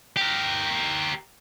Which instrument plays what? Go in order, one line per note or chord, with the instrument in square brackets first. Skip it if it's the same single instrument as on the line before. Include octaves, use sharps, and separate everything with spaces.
[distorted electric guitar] G4 A#4